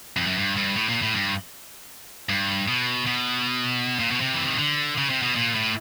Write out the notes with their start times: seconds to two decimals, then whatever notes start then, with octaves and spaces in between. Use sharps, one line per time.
0.17 F2
0.27 F#2
0.38 G2
0.57 G2
0.76 A2
0.89 A#2
1.02 A2
1.14 G2
2.29 G2
2.68 B2
3.06 B2
3.99 A#2
4.11 B2
4.21 C3
4.34 E3
4.47 D#3
4.58 D3
4.98 C#3
5.10 C3
5.22 B2
5.36 A#2
5.55 A2